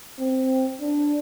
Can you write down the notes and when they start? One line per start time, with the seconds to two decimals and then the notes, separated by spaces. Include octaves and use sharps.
0.20 C4
0.80 D4